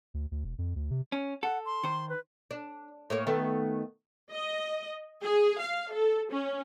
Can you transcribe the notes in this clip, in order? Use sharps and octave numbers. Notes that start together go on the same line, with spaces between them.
D2
D2
E1
F2
D2
C3
C#4
A4 F#5
C6
D#3 C5
B4
D4
A2 A#3 C#5
D#3 A3 B3
D#5
G#4
F5
A4
C#4